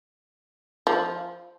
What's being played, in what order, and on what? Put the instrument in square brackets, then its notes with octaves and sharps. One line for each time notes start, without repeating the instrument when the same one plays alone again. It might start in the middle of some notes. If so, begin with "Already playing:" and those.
[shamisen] F3